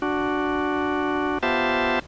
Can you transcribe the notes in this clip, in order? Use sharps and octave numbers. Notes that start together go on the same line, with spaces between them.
D4 F#4
B3 F4 G4 C5 E5 A5